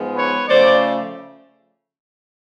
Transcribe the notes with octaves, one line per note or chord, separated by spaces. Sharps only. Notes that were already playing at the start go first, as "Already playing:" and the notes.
Already playing: G#2 F3 G#3 B3
B4 C#5
C#3 F3 A3 C5 D5